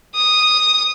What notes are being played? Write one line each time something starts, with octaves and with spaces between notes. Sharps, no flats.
D#6